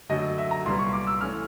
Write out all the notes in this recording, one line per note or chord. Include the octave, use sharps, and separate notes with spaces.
F#2 D3 F#3 A3 D#5
E5
A#5
C2 A#2 G3 B3 C6
C#6
D6
E6
E3 A3 C#4 F6